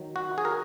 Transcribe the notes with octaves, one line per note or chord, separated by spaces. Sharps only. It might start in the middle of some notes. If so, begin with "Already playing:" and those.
Already playing: D#3 F#3
F#4
G#4
A#4